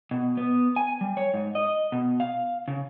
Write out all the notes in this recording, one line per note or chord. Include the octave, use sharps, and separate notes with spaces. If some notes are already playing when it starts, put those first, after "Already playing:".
B2
B3
G#5
G3
C#5
G#2
D#5
B2
F5
C#3